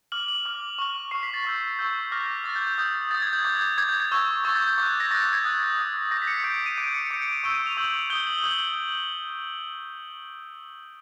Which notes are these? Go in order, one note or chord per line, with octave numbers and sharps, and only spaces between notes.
D6 F6 F#7
F#7
D6 F6
C#6 F6
C#6 F6 C7
B6
A6
C#6 E6 G6
C#6 E6 G6
D6 F6 A#6
D6 F6 A6
G6
G6
D#6 G6
D#6 G6 A6
G#6
G6
D6 G6 G#6
G6
D6 G6 G#6
G6
G#6
C#6 E6 G6
C#6 E6 G6 A6
G6
G6
D6 F#6 G6
G#6
A#6
D6 F#6 A6
G#6
D#6 F#6
D#6 F#6
D6 G6 A#6
B6
C#7
C7
D6 G6 D7
D#7
D6 G6 D7
C#7
D7
D6 G6 C#7
D7
D#7
C#6 E6 G6 D7
D#7
F7
C#6 E6 G6 F#7
D#6 G6 G7
F#7
D#6 G6 F#7